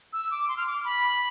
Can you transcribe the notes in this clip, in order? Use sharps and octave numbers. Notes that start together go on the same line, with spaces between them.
E6
D6
C6
F6
D6
B5